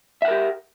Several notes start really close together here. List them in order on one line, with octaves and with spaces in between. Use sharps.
E5 F#5 A#4 G4